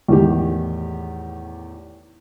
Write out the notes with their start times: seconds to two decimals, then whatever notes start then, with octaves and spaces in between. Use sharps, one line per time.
0.08 E2 A2 D#3 G4